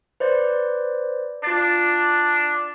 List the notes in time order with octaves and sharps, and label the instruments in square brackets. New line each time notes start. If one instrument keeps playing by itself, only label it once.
[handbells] B4 C5 D5
[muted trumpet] D4 [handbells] F4 A6